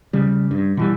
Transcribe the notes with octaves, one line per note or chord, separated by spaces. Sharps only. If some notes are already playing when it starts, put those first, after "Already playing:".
C#3 G3
G2
B2 E3 G3